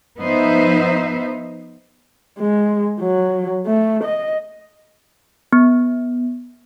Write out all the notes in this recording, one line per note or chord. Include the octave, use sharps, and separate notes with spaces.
F3 B3 D#4 C5 E5
G#3
F#3
A3
D#5
B3